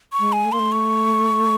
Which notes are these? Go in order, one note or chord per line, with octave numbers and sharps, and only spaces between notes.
C#6
G#3
G#5
A3
A#3 C6
A3
C#6